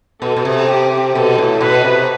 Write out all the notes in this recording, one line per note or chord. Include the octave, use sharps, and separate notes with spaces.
B2 A4
B2
C3
G4
B2 A4
A2
B2 B4
C3